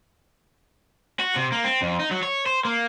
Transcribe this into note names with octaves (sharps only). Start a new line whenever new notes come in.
F#4
C3
A#3
C4
F2
D#4
F#3
C#5
C5
A#3